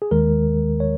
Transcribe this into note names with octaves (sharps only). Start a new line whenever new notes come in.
G#4
D#2 D#3 G#3 A#4
C#5